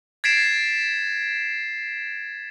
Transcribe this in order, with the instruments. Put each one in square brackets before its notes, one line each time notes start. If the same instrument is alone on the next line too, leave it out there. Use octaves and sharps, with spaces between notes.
[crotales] G#6 A6 B6 C7 D7 E7